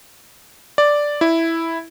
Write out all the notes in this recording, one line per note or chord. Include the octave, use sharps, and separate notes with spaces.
D5
E4